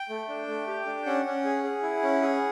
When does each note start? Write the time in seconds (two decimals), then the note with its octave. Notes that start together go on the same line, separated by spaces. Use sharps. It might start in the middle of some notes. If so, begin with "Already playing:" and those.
Already playing: G5
0.09 A3
0.29 D4
0.47 A3
0.67 G4
0.86 D4
1.06 C#4 F#5
1.25 C#4
1.45 G#4
1.63 G#4
1.83 E4
2.02 C#4
2.22 G#4